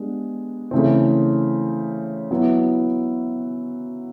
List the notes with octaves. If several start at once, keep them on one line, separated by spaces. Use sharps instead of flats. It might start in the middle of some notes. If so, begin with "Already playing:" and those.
Already playing: G#3 B3 D4 G4
C#3 E3 A3 C4
F#3 B3 E4